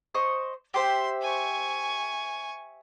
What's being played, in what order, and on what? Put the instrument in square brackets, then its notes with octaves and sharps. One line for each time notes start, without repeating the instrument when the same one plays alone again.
[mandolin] C5 D#5 C#6
[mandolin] G4 C5 E5 [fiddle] C6
[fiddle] G#5 C#6